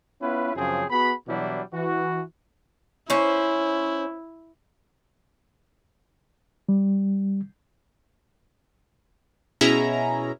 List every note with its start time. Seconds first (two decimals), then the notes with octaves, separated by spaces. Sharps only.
0.21 B3 C#4 E4 F4 B4
0.55 F#2 C#3 F3 C4 G#4
0.90 B3 F#4 G#4 F#5 B5
1.27 B2 E3 F#3 G3 D4 E4
1.73 E3 F#4
3.10 C#4 E4 C5
6.69 G3
9.61 B2 C#4 E4 G#4 E5 A#5